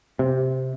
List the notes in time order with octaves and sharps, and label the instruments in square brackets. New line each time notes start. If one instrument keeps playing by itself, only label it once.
[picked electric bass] C3